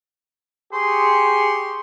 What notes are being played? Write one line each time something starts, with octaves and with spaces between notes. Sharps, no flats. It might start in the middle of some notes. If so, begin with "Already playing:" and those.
G4 G#4 C6 C#6